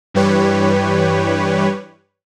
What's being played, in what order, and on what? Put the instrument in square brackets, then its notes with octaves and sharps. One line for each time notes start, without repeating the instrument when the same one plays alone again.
[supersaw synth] G2 E3 G3 G4 B4 C#5